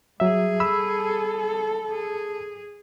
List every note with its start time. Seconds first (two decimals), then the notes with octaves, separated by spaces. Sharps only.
0.20 F#3 G3 G#4 E5
0.60 A4 B5 E6
1.91 G#4